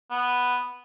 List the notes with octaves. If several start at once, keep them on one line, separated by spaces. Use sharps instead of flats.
B3